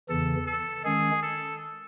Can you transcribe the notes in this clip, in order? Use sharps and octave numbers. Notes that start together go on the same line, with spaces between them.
E2 C#3 E3 A4
A4
D#3 G#3 C#4 G#4
A4